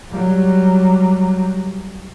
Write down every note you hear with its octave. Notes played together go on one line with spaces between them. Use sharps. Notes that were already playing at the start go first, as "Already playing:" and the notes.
F#3 G3